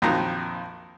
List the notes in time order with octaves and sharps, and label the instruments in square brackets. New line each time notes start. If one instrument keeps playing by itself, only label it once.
[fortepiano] A#1 F2 D#3 F#3 A#5